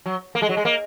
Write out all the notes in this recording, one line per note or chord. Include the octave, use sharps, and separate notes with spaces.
F#3
A#3
G#3
F#3
G#3
A#3